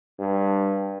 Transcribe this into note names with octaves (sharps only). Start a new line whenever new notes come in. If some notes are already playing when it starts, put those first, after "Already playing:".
G2